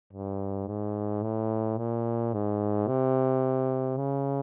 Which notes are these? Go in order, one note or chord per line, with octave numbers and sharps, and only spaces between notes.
G2
G#2
A2
A#2
G#2
C3
C#3